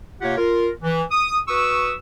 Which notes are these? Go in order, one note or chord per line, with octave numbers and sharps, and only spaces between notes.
C3 A#3 F4 G4 C#5 F#5
F4 A#4
E3
D#6
F#4 B4 C#6 D#6 E6